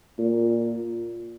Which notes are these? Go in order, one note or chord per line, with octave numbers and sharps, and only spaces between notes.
A#2